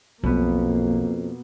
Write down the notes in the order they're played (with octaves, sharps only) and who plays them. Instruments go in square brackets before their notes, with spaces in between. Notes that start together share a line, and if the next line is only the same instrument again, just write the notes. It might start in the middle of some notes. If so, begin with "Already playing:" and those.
[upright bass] B1 F3 [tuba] F2 [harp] B2 B3 [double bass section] A#3